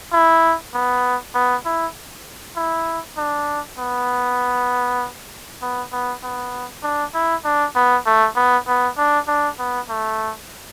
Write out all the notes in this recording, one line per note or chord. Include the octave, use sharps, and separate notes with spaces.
E4
B3
B3
E4
E4
D4
B3
B3
B3
B3
D4
E4
D4
B3
A3
B3
B3
D4
D4
B3
A3